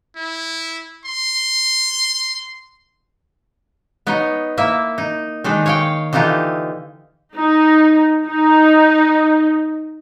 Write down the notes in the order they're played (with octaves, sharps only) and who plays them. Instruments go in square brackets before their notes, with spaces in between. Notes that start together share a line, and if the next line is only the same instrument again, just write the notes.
[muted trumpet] E4
C6
[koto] B3 D#4 C#5 D#5
A#3 E4 E5
D#4
D#3 G#3 D4 D#4
C#5 F5 G5
D3 E3 D#4 F4 G4
[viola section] D#4
D#4